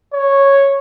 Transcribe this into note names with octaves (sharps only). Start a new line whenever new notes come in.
C#5